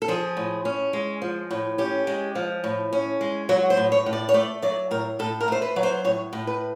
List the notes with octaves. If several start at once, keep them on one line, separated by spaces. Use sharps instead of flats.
A4
F3 G#4
A2
C#4
G#3
F3
A2
C#4 G4
G#3
F3
A2
C#4
G#3
F#3 F#4
C5
A2
C#5
A2
D5
C#5
A3 D5
F#3 D5
A2 A#4
A2 A4
A#4
A3 C5
B4
F#3
C5
A2 C#5
A2
B4